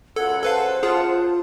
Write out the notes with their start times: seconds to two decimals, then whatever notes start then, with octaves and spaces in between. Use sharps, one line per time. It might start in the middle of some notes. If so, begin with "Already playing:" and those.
0.16 C#2 F#2 F4 A4 F#5 E6 G#6
0.43 A4 B4 C5 F5 A5
0.83 F4 G#4